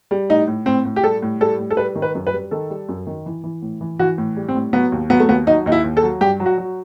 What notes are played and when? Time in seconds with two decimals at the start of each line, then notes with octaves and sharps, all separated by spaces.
0.11 G3
0.29 A2 D#4
0.48 A2
0.66 A2 C4
0.85 A2
0.96 G4
1.04 G3 A4
1.22 A2
1.41 G3 A4
1.59 A2
1.70 A4
1.77 G3 B4
1.95 D#3
2.02 B4
2.15 F#2
2.27 B4
2.33 G3
2.51 D#3 A4
2.70 G3
2.89 F#2
3.07 D#3
3.26 E3
3.44 E3
3.62 A2
3.81 E3
3.99 E3 F#4
4.18 A2
4.36 G3
4.48 C4
4.55 A2
4.73 F#3 B3
4.92 D#2
5.10 F#3 B3
5.20 A3
5.29 D#2 B3
5.47 F#3 D#4
5.66 D#2 D#4
5.72 E4
5.84 D#2
5.97 A4
6.03 F#3
6.21 G2 G4
6.40 F#3
6.46 F#4
6.58 F#3